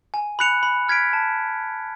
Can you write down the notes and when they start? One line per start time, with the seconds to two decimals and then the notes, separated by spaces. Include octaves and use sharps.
0.14 G#5
0.39 B5 F#6 C#7 F7
0.63 B5
0.88 F6 G#6 B6 D7
1.13 A5